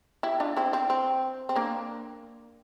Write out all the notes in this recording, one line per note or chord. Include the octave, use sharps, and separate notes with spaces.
E4 G4
D4 F4
C4 E4
C4
C4
C4
A#3 D4